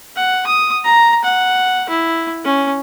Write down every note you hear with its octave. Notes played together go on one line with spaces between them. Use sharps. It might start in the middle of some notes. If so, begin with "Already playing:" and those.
F#5
D#6
A#5
F#5
E4
C#4